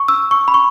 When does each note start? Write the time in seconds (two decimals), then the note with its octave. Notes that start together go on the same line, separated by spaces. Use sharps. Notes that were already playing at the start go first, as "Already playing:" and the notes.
Already playing: C#6
0.08 E6
0.31 C#6
0.48 B5
0.54 C#6